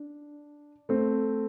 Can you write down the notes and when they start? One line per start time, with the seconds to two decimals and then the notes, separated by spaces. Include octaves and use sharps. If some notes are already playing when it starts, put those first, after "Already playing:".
Already playing: D4
0.89 A3 C4